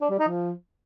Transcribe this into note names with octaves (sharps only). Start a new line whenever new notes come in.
D4
G3
D#4
F3